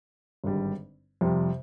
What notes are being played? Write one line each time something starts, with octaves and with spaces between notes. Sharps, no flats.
G#1 G2 D3 G3
F2 C3 G3